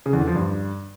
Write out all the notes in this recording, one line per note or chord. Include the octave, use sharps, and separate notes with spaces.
C#3
E2
D3
F3
G2